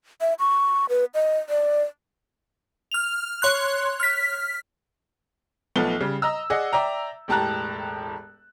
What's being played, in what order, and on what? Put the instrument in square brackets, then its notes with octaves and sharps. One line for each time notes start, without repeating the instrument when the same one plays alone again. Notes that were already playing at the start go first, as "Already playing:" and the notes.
[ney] E5
C#6
B4
D#5
D5
[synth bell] F6 F7
C#5 C6 F#6
F6 B6
[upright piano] B1 F3 A3 B3 G7
C#3 G3
D#5 A#5 E6
G#4 D5 D#5 F#5
D5 E5 G5 A#5
E1 A2 G4 A5 A#5 F#6